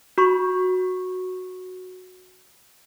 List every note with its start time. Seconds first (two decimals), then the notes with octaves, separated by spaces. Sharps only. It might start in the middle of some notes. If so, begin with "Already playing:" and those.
0.18 F#4 B5 C#6